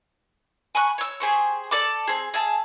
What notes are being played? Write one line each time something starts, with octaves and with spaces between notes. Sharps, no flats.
G#5 B5 C#6 F#6
C#5 E6
G4 G#4 C5 C#6
A4 D5 D6
C4 G#4
G#4 E5 A5